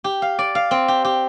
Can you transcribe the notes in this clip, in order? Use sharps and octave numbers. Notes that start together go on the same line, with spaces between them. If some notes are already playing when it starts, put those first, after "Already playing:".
G4
F5
D5
F5
C4
G4
G4